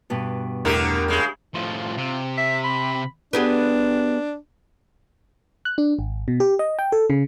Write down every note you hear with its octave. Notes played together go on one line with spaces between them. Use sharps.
G2 B2 B3
E2 A2 D3 G4 A#4
C#3 G#3
A2 F3 F4
C3
E5
B5
B3 D4 G4 G#4
F#6
D4
G#1
B2
G4
D#5
G5
A4
C#3